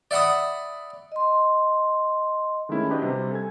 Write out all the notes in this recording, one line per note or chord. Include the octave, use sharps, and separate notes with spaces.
D5 E5 F#5 B5 D#6
D#5 C6
D#3 G#3 A3 C#4 E4
D4 D#4 F#4 G4 B4 D#5
C3 G3
A4 G#5 G#6